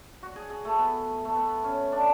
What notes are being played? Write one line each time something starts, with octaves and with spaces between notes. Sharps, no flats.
F#4
G#4
G#4
A3
B3
A3
B3
C#4
D4